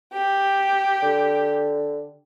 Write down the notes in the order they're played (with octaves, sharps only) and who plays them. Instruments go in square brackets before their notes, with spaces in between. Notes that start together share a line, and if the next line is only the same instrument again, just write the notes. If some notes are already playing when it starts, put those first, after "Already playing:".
[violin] G4
[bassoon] D3